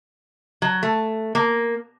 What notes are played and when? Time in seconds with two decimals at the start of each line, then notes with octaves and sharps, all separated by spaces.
0.62 F#3
0.83 A3
1.35 A#3